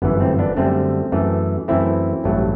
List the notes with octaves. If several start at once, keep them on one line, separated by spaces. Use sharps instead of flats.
G1 F#2 E3 B3
A3 C4
B3 D4
F#2 D3 G3 A3 C4
F#2 E3 A3
F#2 E3 A3 C4 E4
A1 G2 F#3 A3